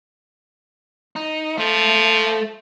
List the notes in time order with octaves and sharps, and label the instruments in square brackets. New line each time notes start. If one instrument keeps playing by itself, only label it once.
[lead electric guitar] D#4
[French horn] F3 [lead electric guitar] A3